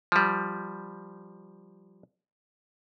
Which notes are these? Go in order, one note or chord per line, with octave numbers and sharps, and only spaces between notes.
F3 G3